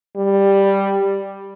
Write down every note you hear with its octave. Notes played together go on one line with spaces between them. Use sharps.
G3